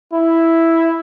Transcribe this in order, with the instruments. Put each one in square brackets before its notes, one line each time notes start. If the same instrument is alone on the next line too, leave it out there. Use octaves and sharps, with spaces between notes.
[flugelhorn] E4